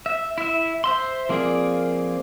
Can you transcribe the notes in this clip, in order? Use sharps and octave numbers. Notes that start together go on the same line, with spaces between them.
E5
E4 E5
C5 E5 C6
F3 A#3 C4 G#4 D5